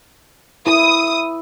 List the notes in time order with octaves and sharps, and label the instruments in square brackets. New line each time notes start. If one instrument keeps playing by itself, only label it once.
[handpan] E4 [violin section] D#6